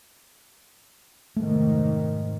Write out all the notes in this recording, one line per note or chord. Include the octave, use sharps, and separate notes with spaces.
F1 G#2 D#3 A3